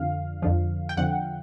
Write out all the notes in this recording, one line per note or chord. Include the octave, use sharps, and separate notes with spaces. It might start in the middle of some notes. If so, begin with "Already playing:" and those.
Already playing: F2 D3 F3 F5
F2 D3 F3
G5
F2 D3 F3 F#5